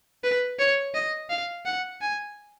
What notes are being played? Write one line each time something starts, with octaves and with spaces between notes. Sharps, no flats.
B4
C#5
D#5
F5
F#5
G#5